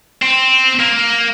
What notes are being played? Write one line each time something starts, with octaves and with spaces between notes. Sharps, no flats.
C4
A#3